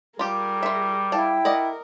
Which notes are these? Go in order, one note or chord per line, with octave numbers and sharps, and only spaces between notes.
G3 F4 G4 G#4 A#4
F4 E5
E4 F5 G5 A5
A#4 D5 D#5 F#5